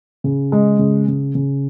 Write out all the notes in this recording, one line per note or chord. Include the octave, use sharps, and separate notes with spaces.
C#3
G#3
C#3
C#3
C#3